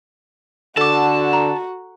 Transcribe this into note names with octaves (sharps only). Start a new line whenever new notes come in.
D3 F#4 A4 A5 D6
A#5